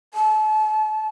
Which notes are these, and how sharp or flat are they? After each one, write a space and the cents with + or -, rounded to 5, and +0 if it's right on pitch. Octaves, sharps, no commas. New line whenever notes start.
A5 -35